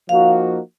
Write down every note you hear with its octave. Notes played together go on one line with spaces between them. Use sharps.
F3 A#3 D#4 F#4 F5